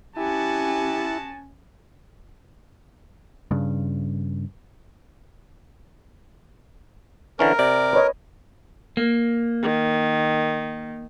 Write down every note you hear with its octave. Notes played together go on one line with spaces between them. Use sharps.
B3 C#4 E4 F#4 G4 G#5 A5
G2 C#3
D3 E3 C#4 A#4
C3 D5
B4 C#5 D#5
A#3
D#3